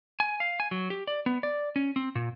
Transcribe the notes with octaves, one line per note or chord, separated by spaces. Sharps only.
G#5
F5
G#5
F#3
G4
D5
B3
D5
C#4
C4
A#2